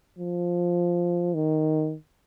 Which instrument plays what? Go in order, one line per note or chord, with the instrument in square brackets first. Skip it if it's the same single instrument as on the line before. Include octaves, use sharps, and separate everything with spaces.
[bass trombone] F3
D#3